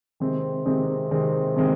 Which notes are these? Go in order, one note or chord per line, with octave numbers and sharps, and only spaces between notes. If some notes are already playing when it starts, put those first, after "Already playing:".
C3 D#3 G#3 C4
C3 D#3 G#3 C4
C3 D#3 G#3 C4
C3 D#3 G#3 C4